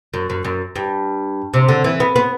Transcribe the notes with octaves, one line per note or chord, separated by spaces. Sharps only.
F#2
F#2
F#2
G2
C3
D3
E3
B3
B3